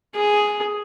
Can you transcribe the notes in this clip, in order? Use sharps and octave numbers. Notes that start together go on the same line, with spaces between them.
G#4